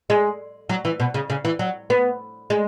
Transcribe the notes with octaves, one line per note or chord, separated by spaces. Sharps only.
G#3
F#3
E3
B2
C#3
C#3
E3
F#3
B3
G#3